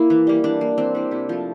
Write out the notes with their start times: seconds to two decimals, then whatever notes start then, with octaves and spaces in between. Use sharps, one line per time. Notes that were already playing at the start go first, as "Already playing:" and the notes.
Already playing: A#3 E4
0.10 E3
0.27 G3 A#3
0.44 E3 D4
0.61 A#3
0.78 E3 C4
0.95 G3 A#3 D4
1.11 C3 E4
1.29 F3 A3